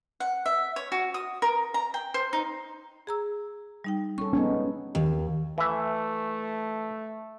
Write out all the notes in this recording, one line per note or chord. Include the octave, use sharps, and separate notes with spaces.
F#5
E5
C#5
F#4
D#6
A#4
A#5
G5
C5
D#4
G#4 A#5 E6
G3 D#4 G5
C#4 A4 C#6
G#3 B3 C#4 D#4
D#2
E3 A3 E5